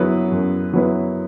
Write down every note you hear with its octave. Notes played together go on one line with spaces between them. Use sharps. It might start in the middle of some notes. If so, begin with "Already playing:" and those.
Already playing: F#2 F#3 B3 E4 B4
F#2
F#3 B3 E4 B4